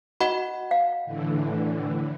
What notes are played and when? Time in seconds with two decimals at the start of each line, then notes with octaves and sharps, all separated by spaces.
0.21 F#4 D#5 F#5 B5
0.71 F5
1.05 A2 D3 E3